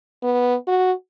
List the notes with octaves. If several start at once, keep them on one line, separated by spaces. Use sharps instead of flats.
B3
F#4